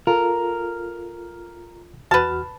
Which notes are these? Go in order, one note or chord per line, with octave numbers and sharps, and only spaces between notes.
F4 A4 A#4
E2 F#4 B4 A5 F6